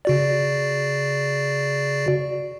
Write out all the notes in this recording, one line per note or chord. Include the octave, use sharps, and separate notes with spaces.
C#3 F#4 D5